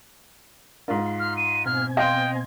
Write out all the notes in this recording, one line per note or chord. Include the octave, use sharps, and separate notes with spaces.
G#2 D4 F4 A#4
C6
F6
D#7
B2 C4 G#5 F6
D#5 F5 G5 C6